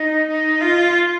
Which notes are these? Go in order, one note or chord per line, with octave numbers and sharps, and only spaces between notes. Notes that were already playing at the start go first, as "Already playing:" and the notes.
Already playing: D#4
D#4
F4